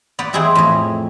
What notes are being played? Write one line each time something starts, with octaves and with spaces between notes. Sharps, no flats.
B3 D5
E2 C4 E4 G#4 D#5 G5
F2 A2